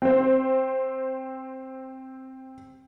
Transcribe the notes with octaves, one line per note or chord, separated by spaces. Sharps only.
C4 C5